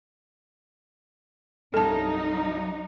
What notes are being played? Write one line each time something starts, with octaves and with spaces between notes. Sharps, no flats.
C2 G2 F#3 D#4 A4 A5